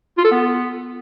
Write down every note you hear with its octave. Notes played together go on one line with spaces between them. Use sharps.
F4
A4
B3